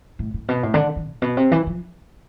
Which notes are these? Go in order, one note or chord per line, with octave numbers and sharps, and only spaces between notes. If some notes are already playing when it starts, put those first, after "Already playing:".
A2
A2
B2
A2
D3
E3
A2
B2
C3
E3
F3